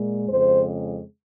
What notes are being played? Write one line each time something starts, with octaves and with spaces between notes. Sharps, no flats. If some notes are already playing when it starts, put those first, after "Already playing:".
Already playing: A#2 G#3
F2 C#3 G#3 C5